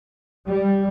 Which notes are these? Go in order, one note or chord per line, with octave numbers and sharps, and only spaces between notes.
G3